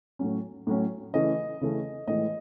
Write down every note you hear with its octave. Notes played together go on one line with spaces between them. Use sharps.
A2 F#3 C#4
A2 F#3 C#4
C#3 E3 A3 C#4 D#5
C#3 E3 A3 C#4
A2 E3 G#3 D#5